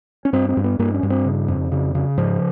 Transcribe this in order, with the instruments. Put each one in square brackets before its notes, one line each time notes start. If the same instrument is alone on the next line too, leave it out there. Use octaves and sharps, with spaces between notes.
[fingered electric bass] C#4
G2 C4
C4
G2
B3
G2 A#3
C#4
G2
C4
C#3
F2
C#3
C#3
G#2 F3